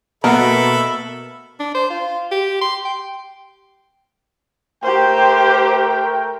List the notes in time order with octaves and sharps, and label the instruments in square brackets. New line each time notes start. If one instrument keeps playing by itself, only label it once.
[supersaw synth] B2 [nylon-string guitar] A#3 [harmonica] A4 E5 B5 [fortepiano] A#4 F#5
[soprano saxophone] D4
C5
F4
G4
C6
G5
[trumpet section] A3 A#4 G5 [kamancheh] G4 C5